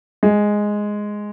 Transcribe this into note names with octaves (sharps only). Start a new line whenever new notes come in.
G#3